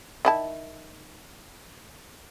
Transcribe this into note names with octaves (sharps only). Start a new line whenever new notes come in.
D#3 E4 A5